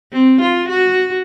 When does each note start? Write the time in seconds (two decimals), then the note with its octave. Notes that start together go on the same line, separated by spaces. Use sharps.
0.12 C4
0.41 F4
0.69 F#4